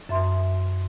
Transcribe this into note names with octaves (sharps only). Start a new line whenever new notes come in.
F#2 E5 C6